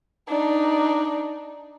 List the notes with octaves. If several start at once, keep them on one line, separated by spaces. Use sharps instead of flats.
D4 D#4